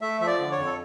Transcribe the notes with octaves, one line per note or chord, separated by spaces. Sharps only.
A3 E5
F3 E5
D5
D3
C#5
F2
A4